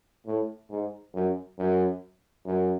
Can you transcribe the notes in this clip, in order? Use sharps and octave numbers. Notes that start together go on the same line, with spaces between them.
A2
G#2
F#2
F#2
F#2